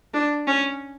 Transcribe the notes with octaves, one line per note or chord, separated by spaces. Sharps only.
D4
C#4